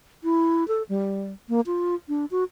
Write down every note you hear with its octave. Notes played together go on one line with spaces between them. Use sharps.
E4
A4
G3
A#3
F4
D4
F#4